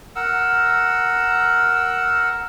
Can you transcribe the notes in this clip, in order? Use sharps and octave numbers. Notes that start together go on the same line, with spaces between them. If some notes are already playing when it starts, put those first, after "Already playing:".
A#4 F#5 E6